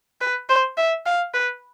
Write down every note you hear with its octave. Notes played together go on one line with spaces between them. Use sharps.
B4
C5
E5
F5
B4